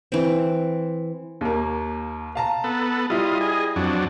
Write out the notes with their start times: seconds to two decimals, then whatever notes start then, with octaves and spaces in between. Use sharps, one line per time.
0.12 E3 C4
1.41 D#2 A#3
2.35 F5 A5 A#5
2.64 B3 A4
3.10 G3 E4 F4 D#5
3.41 G#4 D#5
3.76 F2 F#3 D4